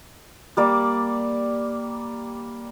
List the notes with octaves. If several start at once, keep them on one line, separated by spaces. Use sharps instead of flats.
G3 A#3 D5